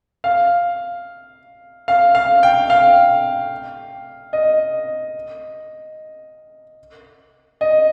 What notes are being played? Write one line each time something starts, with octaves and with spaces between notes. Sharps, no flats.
F5
F5
F5
G5
F5
D#5
D#5